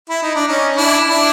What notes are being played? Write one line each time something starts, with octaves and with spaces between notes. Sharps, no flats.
E4
D#4
D4
C#4 D#4
D4 E4
D4 E4